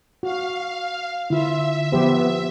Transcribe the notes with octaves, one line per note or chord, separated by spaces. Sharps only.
F#4 F5
D3 E4 F4 E5
F3 B3 G4 C5